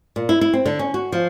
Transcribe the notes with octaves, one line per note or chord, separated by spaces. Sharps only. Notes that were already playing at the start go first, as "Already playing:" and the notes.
A#2
E4
E4
C4
D3
C#4
F#4
F3